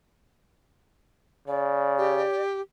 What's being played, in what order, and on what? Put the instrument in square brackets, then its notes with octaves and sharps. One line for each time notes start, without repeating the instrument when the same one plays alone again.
[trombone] C#3 [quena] D5
[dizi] G4